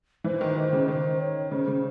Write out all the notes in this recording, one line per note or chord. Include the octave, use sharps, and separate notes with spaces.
E3 C5
D#3
D#3 C5
C#3
D#3 C5
C#5
C#3 C5
C#3